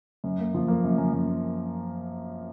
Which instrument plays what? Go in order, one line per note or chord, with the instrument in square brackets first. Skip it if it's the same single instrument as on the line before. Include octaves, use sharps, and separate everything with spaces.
[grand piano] F#2
A#3
F3
A#3
F#2
F#2
F#2